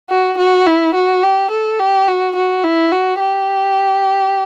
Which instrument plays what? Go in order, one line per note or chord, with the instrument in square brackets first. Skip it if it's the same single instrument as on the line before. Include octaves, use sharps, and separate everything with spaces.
[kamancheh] F#4
F#4
E4
F#4
G4
A4
G4
F#4
F#4
E4
F#4
G4